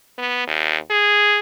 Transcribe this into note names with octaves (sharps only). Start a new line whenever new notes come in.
B3
D#2
G#4